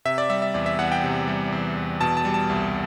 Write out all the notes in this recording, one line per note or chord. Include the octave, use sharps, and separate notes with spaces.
C3 E5
D5
G3 E5
E5
E2 D5
E5
E2 F#5
G5
C3
G3
E2
E2
B2 A5
A5
G3
A5
C2